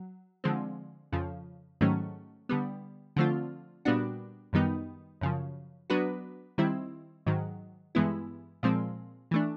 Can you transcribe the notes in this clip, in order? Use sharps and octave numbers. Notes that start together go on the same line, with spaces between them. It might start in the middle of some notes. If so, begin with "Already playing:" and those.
Already playing: F#3
D3 F3 G#3 C4
F2 C#3 F3
G#2 D#3 F#3 A3 C#4
D3 G3 B3
D3 F3 A3 C4 F4
A#2 G3 B3 D4 F#4
F#2 D#3 G3 B3 D#4
F#2 C#3 F3
F#3 B3 D4 F#4 B4
D#3 G3 C4 E4
G#2 D#3 F#3
G2 E3 G#3 B3 E4
A#2 F3 G#3 C4
E3 A3 D4